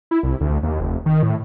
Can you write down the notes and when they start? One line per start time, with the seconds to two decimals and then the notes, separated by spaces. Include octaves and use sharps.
0.11 E4
0.23 C2
0.41 D2
0.63 D#2
0.80 F1
1.06 D#3
1.23 A2